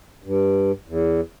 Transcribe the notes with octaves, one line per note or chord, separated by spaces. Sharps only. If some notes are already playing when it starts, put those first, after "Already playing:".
G2
E2